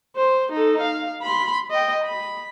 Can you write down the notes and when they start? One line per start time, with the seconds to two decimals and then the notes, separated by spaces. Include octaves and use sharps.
0.16 C5
0.52 D#4 A4
0.81 F5
1.22 B5 C6
1.71 D#5 G5
2.04 B5